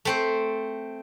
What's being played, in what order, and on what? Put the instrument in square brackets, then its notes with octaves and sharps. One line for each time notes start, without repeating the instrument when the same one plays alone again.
[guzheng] A3 C4 C5